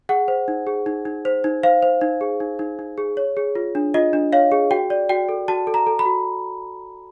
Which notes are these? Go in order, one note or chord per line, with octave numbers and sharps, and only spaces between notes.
G#4 F#5
C5
D#4
G#4
D#4
D#4
C5
D#4
C5 F5
C5
D#4
G#4
D#4
D#4
D#4
G#4
C#5
G#4
F4
D4
F4 D#5
D4
C#5 F5
G#4
F#4 G5
D5
F#4 G5
A4
F#4 A5
A4
A#5
A4
B5
F#4